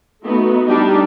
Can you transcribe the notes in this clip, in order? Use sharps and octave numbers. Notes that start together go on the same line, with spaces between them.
A3 B3 D#4 F#4
G3 D4 D#4 G4